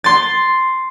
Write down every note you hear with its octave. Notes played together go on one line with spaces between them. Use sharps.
C6 A6